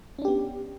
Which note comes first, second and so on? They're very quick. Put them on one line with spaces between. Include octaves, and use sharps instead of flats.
C#4 D4 G4 B3